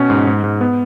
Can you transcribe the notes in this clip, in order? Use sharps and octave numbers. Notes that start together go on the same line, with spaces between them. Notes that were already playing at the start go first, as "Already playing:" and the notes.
Already playing: B2 C#4
G#2
G#2
G#2
B3